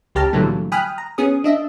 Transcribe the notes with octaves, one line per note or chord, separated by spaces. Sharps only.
C#2 C#3 G4 A5 A#5 F6
A#2 D3 E3 F#3 G3 A3
G5 G#5 B5 D#6 F6 F#6
A#5
B3 C#4 G#4 D#6
D4 D#5 E5